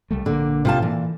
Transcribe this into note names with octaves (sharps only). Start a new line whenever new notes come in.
C2 G3 A3
A#1 D3 D#3 A#3
C3 F4 A5
A#2 E3